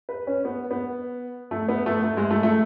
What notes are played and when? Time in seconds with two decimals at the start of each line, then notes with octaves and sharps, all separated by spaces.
0.09 B4
0.27 C#4
0.45 B3
0.71 B3
1.51 A3
1.68 B3
1.86 A3
2.03 A3
2.17 G#3
2.30 A3
2.43 A3